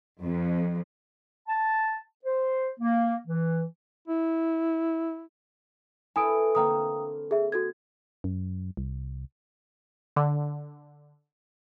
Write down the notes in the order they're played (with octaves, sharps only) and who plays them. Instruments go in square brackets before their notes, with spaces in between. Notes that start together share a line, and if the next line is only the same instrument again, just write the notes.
[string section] F2
[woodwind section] A5
C5
A#3
E3
[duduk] E4
[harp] E4 A4 B4 [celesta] G#5 D#6 D7
[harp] D3 A#3 C4 [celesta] G5 A#5 D#6
[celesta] G#4 E5
F#4 A4 G#6
[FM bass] F#2
C2
[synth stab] D3